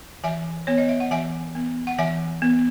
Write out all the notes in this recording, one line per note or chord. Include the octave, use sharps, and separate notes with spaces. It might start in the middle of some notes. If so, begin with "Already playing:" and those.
E3 E5 G#5
B3 C#5
D#5
E5
F#5
E3 E5 G#5
B3
F#5
E3 E5 G#5
B3